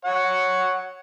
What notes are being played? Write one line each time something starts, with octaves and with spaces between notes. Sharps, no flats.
C#5 F#5